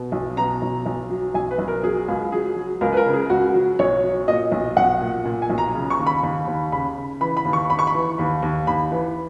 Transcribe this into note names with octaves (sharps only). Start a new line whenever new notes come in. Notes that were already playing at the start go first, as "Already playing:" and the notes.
Already playing: B2
B1
B2 A#5
B1
B1
F#3
B1 G#5
B4
B1
A#4
F#3 G#4
C#2
F#3 G#4
F#3
C#2 A#4
B4
A#4
C#3
G#4
C#2 F#4
F#3
B1 C#5
F#3
A#2 D#5
B1
B1 F#5
A#2
A#2
G#5
B1
A#5
C#3
C#6
D#2
B5
D#2 B5
D#2
C#3 B5
C#3
E3 B5
B5
D#2
C#6
D#2 B5
C#6
B5
E3
D#2 B5
D#2
D#2 B5
E3